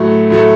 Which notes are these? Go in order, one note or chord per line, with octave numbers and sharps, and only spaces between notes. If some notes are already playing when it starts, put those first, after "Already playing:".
Already playing: A2 F#3 A3
A2 F#3 A3